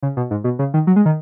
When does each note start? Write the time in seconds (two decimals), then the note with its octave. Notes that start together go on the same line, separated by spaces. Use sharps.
0.02 C#3
0.17 B2
0.31 G#2
0.44 B2
0.59 C#3
0.74 D#3
0.87 F#3
0.96 G#3
1.06 D#3